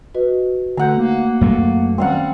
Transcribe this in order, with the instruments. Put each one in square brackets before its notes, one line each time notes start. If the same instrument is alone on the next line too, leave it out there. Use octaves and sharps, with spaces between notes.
[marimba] F#4 B4 D#5
[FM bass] D3 [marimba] A3 F#4 G6 [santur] F#5 A#5
[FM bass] A#3 [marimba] D#4 A#4
[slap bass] F#2 F#3 A3
[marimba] D#3 C#4 A#5 [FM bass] G3 [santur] C4 F5 F#5